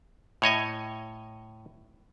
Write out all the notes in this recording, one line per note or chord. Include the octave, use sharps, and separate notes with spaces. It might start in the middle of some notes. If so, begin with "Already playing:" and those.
A2 C#5 D#5 G#5